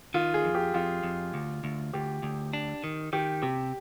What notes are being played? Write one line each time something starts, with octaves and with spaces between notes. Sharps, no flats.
D#3 F4
G#4
F2
G4
F2 F4
F2
D2
D2
D2 G4
D2
D4
D#3
D#3 G4
C3 G4